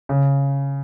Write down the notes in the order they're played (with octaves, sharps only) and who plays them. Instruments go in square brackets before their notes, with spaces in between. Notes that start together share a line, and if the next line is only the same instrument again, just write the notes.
[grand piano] C#3